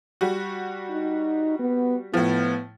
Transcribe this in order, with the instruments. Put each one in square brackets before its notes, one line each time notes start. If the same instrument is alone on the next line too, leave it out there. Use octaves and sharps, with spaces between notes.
[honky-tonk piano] G3 F#4
[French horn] D#4
B3
[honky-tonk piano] A2 F3 [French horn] B3